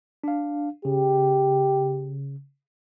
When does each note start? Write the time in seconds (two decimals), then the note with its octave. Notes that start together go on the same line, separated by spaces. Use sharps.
0.24 D4 F5
0.85 C#3 G4